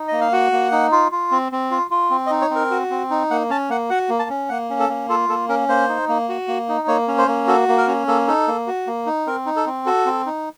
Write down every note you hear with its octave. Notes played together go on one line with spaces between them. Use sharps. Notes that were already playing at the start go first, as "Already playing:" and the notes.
Already playing: D#4
A#3 D#5
F5
F#4 F#5
A#3
D#4
F4
F4
C4
C4
F4
F4
C4
D#5
D#4
C#5
C4 A#4
F#4
C4
D#4
A#3 F#5
C#4 A5
A#3 F#5
F#4 F#5
A#3
A5
C#4
A#3 F#5
C#4
A4
A#3
F4 A4
A#3 A4
C#4 A#4
A#3 C5
D#4
A#3
F#4
A#3
D#4
A#3 C#5
C#4
C5
A#3
F#4 A4
A#3
A#4
C#4
A#3 A4
D#4 A4
A#3
F#4
A#3
D#4
C4 A#4
D#4
A4
C4
F#4 A4
C4
D#4